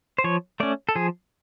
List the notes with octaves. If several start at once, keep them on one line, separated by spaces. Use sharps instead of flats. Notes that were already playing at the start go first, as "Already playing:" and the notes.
C5
F3 C#5
A3 C#4 D5
A4
F3 G#4